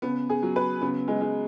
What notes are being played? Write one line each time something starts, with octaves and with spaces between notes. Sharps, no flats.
C#3 B3
G#4
F#3
B4
C#3 B3
G#3
G#3